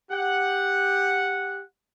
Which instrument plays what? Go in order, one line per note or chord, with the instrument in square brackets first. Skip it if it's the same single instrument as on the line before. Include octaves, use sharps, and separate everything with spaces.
[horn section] G4 F#5